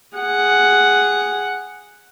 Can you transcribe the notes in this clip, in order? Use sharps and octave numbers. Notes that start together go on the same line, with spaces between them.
G#4 F#5